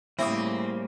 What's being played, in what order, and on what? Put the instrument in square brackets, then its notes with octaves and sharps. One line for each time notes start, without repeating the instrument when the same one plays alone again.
[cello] A2 C#3 [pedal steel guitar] G3 A#3 [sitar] C4 [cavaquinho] E4 D#6